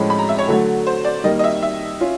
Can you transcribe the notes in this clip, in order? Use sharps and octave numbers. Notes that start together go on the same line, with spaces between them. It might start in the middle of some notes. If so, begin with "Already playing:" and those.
Already playing: A2 F3 G#3 C#4 B5
B5
A#5
E5
C#5
D3 F#3 A3
C5
D5
D#3 G3 A#3 D#5
D#5
E5
E5
C#4 F4